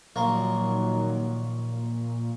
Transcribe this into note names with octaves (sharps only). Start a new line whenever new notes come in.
A#1 A#2 D#3 F#3 A#3